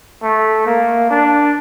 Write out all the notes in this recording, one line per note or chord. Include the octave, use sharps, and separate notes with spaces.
A3
A#3
D4